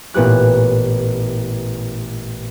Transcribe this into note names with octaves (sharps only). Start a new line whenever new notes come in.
A1 A#2 B3 G4 F#6